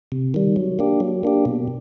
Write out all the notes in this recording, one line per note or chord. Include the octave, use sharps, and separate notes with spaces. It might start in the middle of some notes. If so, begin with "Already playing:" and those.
C3
D#3 G3
F#3
A#3 D4 G4
F#3
A#3 D4 G4
B2